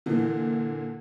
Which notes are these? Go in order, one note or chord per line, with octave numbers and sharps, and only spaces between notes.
A#2 D3 E3